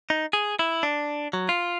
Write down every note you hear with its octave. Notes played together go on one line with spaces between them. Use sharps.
D#4
G#4
E4
D4
F#3
F4